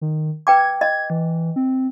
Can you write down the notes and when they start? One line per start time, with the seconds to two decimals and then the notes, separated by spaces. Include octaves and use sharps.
0.01 D#3
0.47 B4 G5 D6 G#6
0.81 D#5 G#6
1.10 E3
1.56 C4